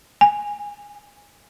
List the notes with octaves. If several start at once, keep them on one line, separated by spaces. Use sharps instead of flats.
G#5